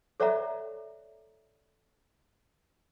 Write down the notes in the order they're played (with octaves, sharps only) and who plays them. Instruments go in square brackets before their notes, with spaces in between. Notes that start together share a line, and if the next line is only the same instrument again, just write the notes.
[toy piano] A4 C#5 D5 E5 F#5 A#5